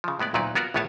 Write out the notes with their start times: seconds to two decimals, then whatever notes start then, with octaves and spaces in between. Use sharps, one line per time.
0.04 C#3 F3
0.19 A2 G#3 B3 D5
0.34 D2 A#2 F#3 D#4 B4 D5
0.55 B3 F4 F#4 A#4 D5
0.74 A#1 A2 B3 F4 C#5 A5